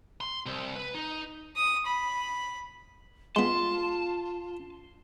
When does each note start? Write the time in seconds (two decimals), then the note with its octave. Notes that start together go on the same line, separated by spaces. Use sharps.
0.21 C6
0.46 C2
0.75 B4
0.95 D#4
1.56 D#6
1.86 B5
3.36 G#3 B3 F4 A5 C6